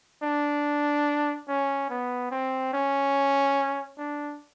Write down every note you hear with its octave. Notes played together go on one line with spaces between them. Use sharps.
D4
C#4
B3
C4
C#4
D4